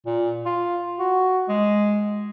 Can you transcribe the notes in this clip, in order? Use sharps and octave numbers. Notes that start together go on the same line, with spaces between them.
A#2
F4
F#4
G#3